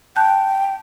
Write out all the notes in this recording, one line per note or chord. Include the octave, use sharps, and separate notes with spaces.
G5 A5 F#6 G6